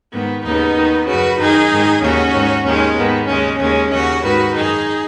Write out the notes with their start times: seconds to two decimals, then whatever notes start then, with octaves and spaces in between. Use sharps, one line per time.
0.13 G#2 D#3 B3
0.45 D#2 C#3 B3 D#4
0.76 D#2 D#3
1.07 F#2 C#3 F#4 B4
1.39 F#2 D#3 D#4 G#4
1.71 G#2 D#3
2.02 D#2 C#3 C#4 F#4
2.34 G#2 D#3
2.65 D#2 D#3 G#3 C#4
2.97 G#2 D#3 B3
3.28 D#2 C#3 G#3 C#4
3.60 D#2 C#3 G#3 C#4
3.92 D#2 C#3 C#4 F#4
4.23 G#2 D#3 F#4 B4
4.55 F#2 D#3 D#4 G#4